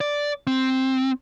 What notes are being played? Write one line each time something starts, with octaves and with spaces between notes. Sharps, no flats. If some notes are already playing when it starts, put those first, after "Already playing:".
D5
C4